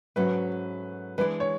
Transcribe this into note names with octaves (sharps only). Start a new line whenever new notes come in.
G#2 F#3 A3 C#4 F#4 B4
E3 G#3 D4 G#4 B4 D5
C#5